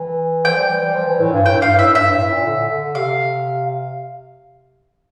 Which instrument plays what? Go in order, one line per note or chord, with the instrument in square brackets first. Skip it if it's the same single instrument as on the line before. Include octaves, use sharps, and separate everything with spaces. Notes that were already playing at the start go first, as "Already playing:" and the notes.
Already playing: [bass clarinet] E3
[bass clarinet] F3 [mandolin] G5
[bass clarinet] G3
E3
G3
F3
E3
A2
G2
[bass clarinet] A2 [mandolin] G5
[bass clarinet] G2 [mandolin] F5
[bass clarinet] A2 [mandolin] E5
[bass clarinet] G2 [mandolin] E5
[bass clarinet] G2
A2
A#2
D3
D3
[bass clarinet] C3 [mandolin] F5